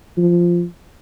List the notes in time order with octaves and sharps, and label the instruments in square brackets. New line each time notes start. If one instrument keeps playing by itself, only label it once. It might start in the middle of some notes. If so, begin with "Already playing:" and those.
[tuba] F3